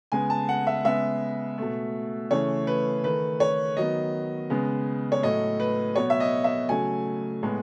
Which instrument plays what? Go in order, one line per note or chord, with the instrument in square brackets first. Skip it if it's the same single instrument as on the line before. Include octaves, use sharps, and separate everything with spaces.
[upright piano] C#3 G#3 B3 G#5
A5
F#5
E5
C#3 G#3 B3 E5
B2 A3
C#3 E3 A3 C#5
B4
D#3 A3 B4
C#5
D#3 F#3 B3 D#5
C#3 G#3 B3
C#5
A2 F#3 A3 D#5
B4
B2 F#3 B3 C#5
E5
D#5
E5
C#3 F#3 A3 G#5
A2 G#3 B3